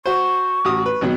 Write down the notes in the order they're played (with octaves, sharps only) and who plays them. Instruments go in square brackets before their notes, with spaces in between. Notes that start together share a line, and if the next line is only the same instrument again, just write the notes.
[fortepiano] F#4 C5 [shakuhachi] C#6
[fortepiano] A1 F#4 D#6
B4
G#1 B2 F#3